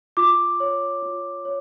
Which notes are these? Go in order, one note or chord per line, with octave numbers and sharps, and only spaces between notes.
F4 D6
C#5
F4
C#5